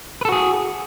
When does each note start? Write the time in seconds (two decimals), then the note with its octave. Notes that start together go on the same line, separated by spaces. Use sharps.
0.21 B4
0.25 A4
0.29 F#4
0.32 G#4